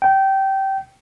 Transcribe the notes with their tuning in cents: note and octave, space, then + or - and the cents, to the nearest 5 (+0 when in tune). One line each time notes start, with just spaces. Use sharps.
G5 -20